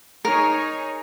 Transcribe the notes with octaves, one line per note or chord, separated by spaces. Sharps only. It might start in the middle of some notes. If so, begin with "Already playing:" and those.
D#4 G#4 A#4 C#5